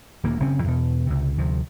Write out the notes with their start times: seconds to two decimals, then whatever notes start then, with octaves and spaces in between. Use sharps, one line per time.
0.24 D#1 D2 A#3
0.40 F#1 C#3 C4 C#4
0.64 E2 B2
1.07 C#2 C3
1.38 D2 C3 F3